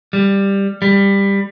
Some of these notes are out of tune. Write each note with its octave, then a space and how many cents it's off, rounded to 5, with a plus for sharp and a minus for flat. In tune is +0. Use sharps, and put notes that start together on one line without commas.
G3 +10
G3 +15